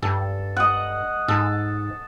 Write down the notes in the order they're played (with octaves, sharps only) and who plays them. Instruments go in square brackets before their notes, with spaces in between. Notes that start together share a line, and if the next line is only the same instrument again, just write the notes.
[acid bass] G2 [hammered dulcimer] A4
[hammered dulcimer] D#5 F#5
[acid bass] G#2 [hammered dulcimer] A4